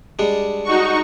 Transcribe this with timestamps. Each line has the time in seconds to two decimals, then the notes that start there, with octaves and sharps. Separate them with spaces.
0.19 G3 G#3 D4
0.64 D#4 F#4 C#6